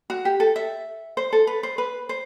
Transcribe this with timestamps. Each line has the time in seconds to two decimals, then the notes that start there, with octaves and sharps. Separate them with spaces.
0.10 F#4
0.25 G4
0.40 A4
0.56 E5
1.17 C5
1.33 A4
1.47 B4
1.63 C5
1.78 B4
2.09 C5